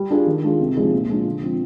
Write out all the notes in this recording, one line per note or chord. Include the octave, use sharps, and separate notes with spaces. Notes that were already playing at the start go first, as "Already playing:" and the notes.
Already playing: G3
D4 F4 G#4
D#3
G#3 D4 F4 G#4
C3
F3 G#3 D#4 G#4
A#2
G#3 D4 F4
D3
F3 C4 F4